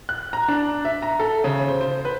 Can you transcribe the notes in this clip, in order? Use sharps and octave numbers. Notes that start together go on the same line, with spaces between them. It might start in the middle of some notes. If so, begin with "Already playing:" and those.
F#6
A#5
D4
E5
A#5
A4
C#3
C5
C5
B4